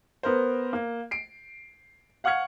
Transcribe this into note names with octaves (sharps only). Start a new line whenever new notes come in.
B3 A#4 C5
A#3
C7 D7
F5 F#5 C#6 F6 G#6 C#7